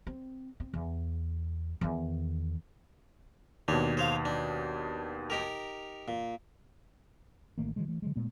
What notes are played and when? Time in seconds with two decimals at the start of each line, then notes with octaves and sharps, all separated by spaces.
0.07 C4
0.60 C4
0.74 E2
1.81 E2 D#3
3.68 D#2 B2 D4 C#5
3.97 C5 C#5 F5
4.25 D4
5.30 D#4 G4 A#4
6.08 A#2
7.58 A1 D#3 A3 A#3
7.76 D3 E3 F#3 G#3
7.88 E3 A3
8.02 D3 F#3 G#3
8.16 A#2 G#3 A3 B3